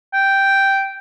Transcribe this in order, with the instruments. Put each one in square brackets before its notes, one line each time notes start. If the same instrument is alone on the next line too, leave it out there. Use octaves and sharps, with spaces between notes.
[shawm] G5